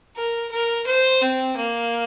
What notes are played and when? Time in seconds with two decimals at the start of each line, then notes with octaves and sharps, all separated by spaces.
0.16 A#4
0.52 A#4
0.87 C5
1.22 C4
1.57 A#3